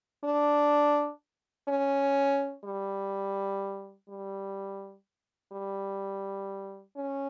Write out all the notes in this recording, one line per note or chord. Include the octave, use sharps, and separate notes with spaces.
D4
C#4
G3
G3
G3
C#4